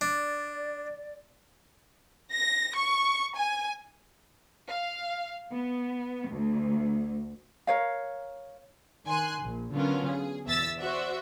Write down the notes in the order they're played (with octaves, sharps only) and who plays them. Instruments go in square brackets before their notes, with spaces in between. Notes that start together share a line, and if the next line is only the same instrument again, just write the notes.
[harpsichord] D4 [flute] D5
[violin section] A#6
C#6
G#5
[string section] F5
B3
D2
[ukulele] A#4 C#5 F5
[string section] D#3 G#5 C6 F#6
A#1
D3 F#3 B3 C#4 F4 A#4
G#4
E2 B2 E5 E6 A6 B6
F#4 C5 D5 E5